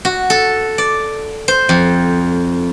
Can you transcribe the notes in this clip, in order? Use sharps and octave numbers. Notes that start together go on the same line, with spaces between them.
F#4
A4
D5
C5
F2